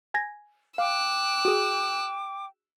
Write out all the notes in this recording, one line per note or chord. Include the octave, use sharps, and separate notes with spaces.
G#5 G#6 A#6
F5 G5 D6 E6 F#6
F#4 G#4